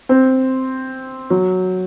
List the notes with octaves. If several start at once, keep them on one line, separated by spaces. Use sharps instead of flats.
C4
F#3